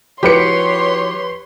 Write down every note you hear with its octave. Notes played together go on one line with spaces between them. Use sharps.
F3 E4 F#4 G4 B4 C#5 C6 C#7